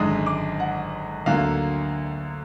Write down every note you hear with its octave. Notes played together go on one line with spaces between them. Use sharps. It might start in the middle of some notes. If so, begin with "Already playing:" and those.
Already playing: G#1 F#2 D3 G#3 D#6
D6
F#5
D2 D3 F#3 A#3 F5